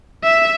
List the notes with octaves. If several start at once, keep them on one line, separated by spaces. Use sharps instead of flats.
E5